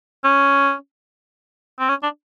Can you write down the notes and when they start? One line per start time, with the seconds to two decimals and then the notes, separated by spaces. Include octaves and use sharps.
0.24 C#4
1.79 C4
1.89 C#4
2.03 D4